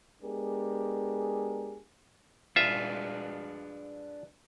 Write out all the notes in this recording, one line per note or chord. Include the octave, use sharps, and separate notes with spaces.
G#3 B3 D4 G4 G#4 A#4
D4 F4 G#4 B4 E5